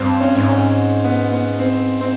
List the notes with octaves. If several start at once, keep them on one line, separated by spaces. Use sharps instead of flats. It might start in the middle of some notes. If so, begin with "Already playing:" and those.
Already playing: G2 C4
C#4
G#2
C#4
B3
B3
C4
C4